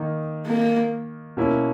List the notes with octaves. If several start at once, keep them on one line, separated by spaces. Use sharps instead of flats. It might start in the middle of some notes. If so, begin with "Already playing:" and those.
Already playing: D#3 A#3 D#4
A#3
B2 A#3 C#4 E4